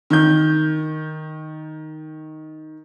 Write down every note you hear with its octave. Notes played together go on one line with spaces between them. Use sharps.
D#3 G6